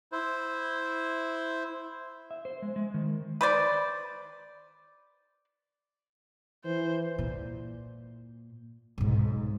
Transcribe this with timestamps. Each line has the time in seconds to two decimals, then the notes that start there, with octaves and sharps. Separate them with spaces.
0.12 E4 C5
2.31 E5
2.45 C5
2.62 G#3
2.76 G#3
2.94 D#3
3.41 B4 C5 D5
6.65 E3 C5
7.18 A#2
8.98 B1 G#2